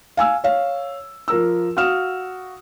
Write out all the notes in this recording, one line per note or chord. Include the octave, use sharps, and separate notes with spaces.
F5 G#5 E6
C#5 F5
F3 A#4 E6
F#4 F5 D#6 F6 E7